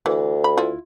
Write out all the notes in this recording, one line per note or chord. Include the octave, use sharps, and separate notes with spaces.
D2 E3
B5
E4 F4